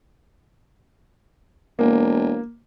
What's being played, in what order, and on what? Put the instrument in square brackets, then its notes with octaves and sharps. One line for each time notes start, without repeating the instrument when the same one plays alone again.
[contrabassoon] E1 [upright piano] A#3